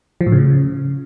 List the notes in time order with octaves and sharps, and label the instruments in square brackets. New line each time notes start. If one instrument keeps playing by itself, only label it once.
[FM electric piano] F3
A2
C#3